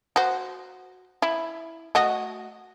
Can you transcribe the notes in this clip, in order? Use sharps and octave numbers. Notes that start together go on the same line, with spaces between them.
F#4 C5
E4
A3 F#4 D#5